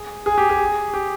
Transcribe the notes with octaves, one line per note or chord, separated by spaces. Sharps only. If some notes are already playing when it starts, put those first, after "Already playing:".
Already playing: G#4
G#4
G4
G#4
G4